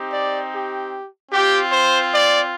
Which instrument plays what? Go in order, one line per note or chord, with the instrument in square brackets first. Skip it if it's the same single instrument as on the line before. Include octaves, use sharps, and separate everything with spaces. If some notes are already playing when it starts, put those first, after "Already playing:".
Already playing: [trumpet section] C4 D#4 G4
D5
G4
C4 F4 G4
C5
D5